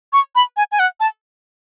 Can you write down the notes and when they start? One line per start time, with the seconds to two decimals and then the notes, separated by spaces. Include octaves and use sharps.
0.13 C#6
0.35 B5
0.57 G#5
0.72 G#5
0.79 F#5
1.00 A5